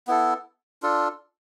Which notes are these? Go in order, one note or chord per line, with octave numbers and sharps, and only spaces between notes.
B3 E4 A4
D4 F4 A4